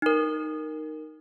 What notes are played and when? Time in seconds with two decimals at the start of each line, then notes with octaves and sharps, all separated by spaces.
0.02 D#4 A#4